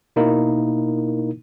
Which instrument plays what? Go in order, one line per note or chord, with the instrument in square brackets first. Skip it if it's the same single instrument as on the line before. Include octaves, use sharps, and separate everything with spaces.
[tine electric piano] B2 A#3 D#4 E4 A#4